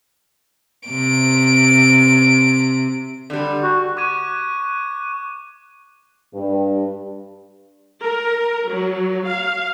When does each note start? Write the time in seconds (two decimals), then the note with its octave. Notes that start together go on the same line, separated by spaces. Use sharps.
0.89 C3 D7
3.30 D3 G3
3.63 F#4
3.97 C#6 D6 F#6 G#6 D#7
6.35 G2
8.04 A#4
8.71 F#3
9.26 F5